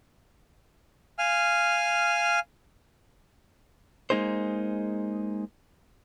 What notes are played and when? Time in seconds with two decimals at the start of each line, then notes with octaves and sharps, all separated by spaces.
1.19 F5 G#5 F6
4.10 G#3 A#3 D#4 G#4 C5